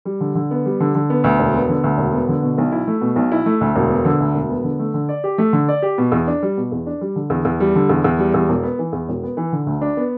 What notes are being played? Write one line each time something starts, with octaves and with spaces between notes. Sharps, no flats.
G3
D3
D3
B3
G3
D3
D3
B3
D2
E1
B3
D3
D2
E1
B3
D3
B2
B1
E4
A3
B2
B1
E4
A3
D2
E1
B3
D3
D2
E1
B3
D3
A3
D3
D5
G4
A3
D3
D5
G4
B2
E2
D4
G3
B2
E2
D4
G3
D3
E2
E2
G3
D3
E2
E2
G3
E2
E1
B3
E3
E2
E1
B3
E3
D3
D2
D4
B3